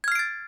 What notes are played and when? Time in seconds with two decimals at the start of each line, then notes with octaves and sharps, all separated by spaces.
0.04 G#6
0.08 F6
0.12 C7
0.15 D7
0.19 A6